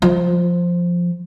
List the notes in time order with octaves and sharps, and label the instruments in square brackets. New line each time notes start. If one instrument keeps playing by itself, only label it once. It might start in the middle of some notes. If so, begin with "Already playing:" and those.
[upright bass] F3